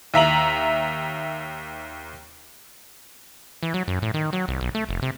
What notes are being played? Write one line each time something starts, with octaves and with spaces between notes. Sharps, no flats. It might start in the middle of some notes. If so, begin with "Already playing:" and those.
D#2 E5 A#5 F#7
E3
F#3
F#2
A2
D#3
F#3
C2
B1
A3
F1
C3